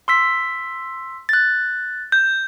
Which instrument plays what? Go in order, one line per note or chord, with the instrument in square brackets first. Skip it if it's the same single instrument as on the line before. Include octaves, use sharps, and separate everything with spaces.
[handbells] C6 E6 B6
F#6 A6
[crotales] G6